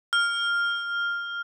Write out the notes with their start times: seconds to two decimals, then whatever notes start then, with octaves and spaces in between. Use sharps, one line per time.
0.13 F6